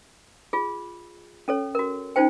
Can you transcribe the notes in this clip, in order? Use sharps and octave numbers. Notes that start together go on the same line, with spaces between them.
F4 G#4
C#4 A4 C#5
F#4 A#4
C#4 D#4 F4 C5 G5